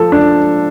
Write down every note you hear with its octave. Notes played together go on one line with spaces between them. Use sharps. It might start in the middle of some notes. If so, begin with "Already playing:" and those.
Already playing: F3 A4
D4